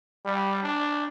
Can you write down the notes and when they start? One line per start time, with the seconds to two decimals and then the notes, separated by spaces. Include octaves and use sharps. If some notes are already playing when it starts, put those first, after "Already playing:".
0.25 G3
0.63 D4